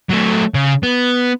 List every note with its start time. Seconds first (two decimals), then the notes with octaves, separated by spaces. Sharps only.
0.09 F#3 A3
0.55 C#3
0.83 B3